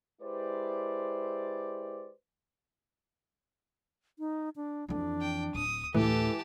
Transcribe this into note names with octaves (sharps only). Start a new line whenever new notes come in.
G#3 E4 G4 B4 C5 D5
D#4
D4
F2 E3 D4
G5
D1 D#6
D2 A2 E3 G4 A4 A5